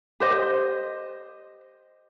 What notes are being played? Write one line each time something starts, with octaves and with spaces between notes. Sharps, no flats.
G4 C5 D#5